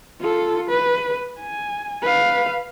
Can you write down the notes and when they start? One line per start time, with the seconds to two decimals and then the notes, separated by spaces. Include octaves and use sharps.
0.21 F4 A4
0.70 B4
1.39 G#5
2.03 B4 F5